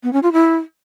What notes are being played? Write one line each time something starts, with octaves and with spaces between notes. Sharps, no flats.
B3
C#4
F4
E4